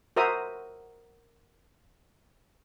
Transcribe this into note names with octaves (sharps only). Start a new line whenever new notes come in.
F#4 A#4 C5 E5 A#5 D#6